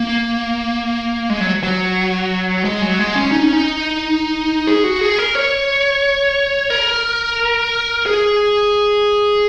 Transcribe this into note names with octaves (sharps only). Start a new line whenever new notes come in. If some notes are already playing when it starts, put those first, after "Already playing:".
Already playing: A#3
G#3
F#3
F#3
G#3
F#3
G#3
C#4
D#4
C#4
D#4
G#4
F#4
G#4
A#4
C#5
A#4
G#4